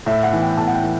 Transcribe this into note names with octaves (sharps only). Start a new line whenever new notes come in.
A2 E5
F#5
E3
G5
A2 A5
F#5
G5
E3